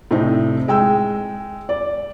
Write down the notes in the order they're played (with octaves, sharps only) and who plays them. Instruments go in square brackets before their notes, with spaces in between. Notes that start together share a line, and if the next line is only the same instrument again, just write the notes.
[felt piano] A2 C3 C4 D4 D#4
G#3 G5 E6
D5